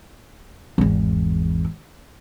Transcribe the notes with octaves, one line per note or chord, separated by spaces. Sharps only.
G#1 E2